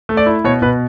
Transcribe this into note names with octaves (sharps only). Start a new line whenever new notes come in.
A3
D5
E4
B2 C#5
B2 B4